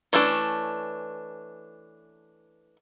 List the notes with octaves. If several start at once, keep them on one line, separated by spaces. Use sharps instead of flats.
E3 A3 C#4 D4